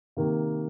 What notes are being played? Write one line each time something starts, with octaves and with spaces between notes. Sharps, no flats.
C3 D#3 A#3